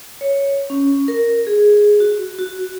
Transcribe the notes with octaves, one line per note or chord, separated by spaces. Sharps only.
C#5
C#4
A#4
G#4
F#4
F#4